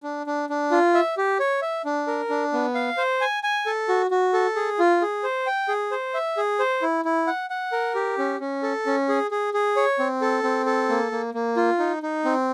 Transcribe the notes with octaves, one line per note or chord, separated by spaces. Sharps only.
D4
D4
D4
F4
E5
G4
C#5
E5
D4
A#4
D4
B3
F5
C5
G#5
G#5
A4
F#4
F#4
A4
G#4
F4
G#4
C5
G5
G#4
C5
E5
G#4
C5
E4
E4
F#5
F#5
A#4
G4
C#4
C#4
A4
C#4
G#4
G#4
G#4
C#5
C4
A4
C4
A4
A#3
A#3
A#3
F4
D#4
D#4
C4